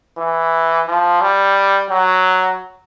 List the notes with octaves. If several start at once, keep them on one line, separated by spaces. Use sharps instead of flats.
E3
F3
G3
F#3